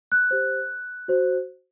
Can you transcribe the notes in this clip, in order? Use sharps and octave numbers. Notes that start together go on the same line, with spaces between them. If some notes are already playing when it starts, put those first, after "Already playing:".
F#6
G4 C5
F#4 C5